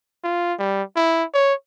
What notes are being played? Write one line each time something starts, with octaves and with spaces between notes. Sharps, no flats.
F4
G3
E4
C#5